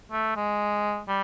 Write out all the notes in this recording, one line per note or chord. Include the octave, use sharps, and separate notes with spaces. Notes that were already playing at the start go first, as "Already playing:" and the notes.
A3
G#3
G3